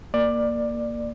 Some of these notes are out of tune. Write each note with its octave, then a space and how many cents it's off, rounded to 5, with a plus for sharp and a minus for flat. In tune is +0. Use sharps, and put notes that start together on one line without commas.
A#3 +0 D5 +15